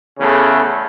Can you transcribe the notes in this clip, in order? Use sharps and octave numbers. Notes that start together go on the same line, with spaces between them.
E2 C#3 A3